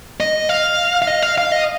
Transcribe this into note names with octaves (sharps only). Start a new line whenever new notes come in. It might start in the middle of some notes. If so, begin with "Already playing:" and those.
D#5
F5
F5
D#5
F5
F5
D#5